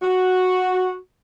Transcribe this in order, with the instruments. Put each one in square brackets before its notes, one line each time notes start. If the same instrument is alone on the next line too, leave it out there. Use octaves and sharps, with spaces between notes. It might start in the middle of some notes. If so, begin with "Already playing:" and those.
[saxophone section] F#4